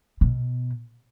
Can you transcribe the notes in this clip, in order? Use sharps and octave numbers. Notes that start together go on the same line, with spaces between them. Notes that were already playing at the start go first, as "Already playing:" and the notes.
B2